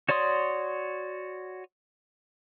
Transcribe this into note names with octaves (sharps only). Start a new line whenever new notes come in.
F#4 C#5 D5 C6 D#6